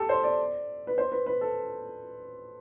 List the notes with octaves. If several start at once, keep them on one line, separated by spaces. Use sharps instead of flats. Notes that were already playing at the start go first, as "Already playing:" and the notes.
Already playing: G4 A4
C5
D5
B4
C5
B4
B4
A4